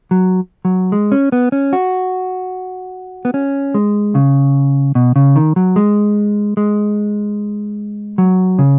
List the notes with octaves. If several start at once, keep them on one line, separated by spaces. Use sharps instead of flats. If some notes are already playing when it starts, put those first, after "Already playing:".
F#3
F#3
G#3
C#4
B3
C#4
F#4
B3
C#4
G#3
C#3
B2
C#3
D#3
F#3
G#3
G#3
F#3
C#3